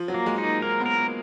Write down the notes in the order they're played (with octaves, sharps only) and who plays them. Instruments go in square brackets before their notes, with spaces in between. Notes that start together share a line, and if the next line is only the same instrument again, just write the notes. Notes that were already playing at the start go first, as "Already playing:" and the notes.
Already playing: [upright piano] F3
F#3
[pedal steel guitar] A#3
[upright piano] G#3
[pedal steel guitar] D#4
[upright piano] A#3
[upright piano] A#3 [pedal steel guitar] A#4
[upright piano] B3
[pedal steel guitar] A#4
[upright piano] A#3